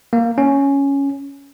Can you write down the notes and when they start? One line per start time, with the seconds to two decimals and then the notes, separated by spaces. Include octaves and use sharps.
0.13 A#3
0.38 C#4